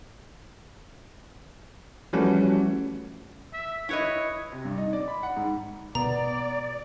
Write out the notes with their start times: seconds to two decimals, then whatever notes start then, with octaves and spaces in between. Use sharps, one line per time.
2.13 E3 F3 G3 A3 C#4 F#4
3.53 E5
3.89 E4 B4 C#5 D#5
4.52 C3
4.65 G2
4.78 D#4
4.93 D5
5.08 B5
5.23 F#5
5.36 G#2
5.95 B2 B3 D5 A#5